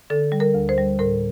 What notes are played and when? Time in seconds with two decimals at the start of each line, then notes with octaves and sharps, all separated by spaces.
0.10 D3 A4
0.32 G3
0.40 A#4
0.54 D2
0.69 C5
0.78 G3
0.99 A2 A#4